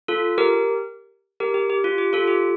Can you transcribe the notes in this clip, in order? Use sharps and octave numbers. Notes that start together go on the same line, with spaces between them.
F4 A4
G4 A#4
G4 A#4
G4
G4
F4
G4
F4 A4
G4